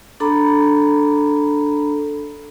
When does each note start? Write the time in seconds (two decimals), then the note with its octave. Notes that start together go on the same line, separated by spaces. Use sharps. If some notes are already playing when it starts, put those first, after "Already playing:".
0.20 D4 A4 A#5 B5